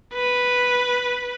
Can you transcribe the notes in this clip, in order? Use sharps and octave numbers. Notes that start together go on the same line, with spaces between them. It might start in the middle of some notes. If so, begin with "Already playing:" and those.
B4